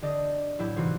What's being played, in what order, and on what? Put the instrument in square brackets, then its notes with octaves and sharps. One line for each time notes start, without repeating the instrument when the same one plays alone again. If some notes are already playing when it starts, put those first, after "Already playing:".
[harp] D3 G4 D5 D#5
A2 F#3 E4 G4
G#2 C3 E3 F4 F#4